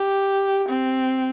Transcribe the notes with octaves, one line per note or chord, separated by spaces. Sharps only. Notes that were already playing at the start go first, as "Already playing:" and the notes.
Already playing: G4
C4